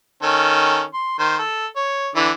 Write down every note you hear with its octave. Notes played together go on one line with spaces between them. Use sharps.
D#3 C#4 A4
C6
D#3 C5
A4
C#5
D3 E3 D5